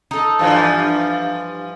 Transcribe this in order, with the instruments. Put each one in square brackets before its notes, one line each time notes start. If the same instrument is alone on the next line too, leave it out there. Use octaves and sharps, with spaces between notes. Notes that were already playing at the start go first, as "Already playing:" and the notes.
[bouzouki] D#4 A4
[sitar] G2 E3 F3